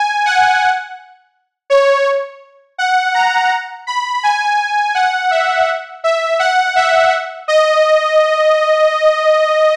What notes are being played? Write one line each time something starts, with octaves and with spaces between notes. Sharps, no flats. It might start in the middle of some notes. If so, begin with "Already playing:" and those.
Already playing: G#5
F#5
C#5
F#5
A#5
B5
G#5
F#5
E5
E5
F#5
E5
D#5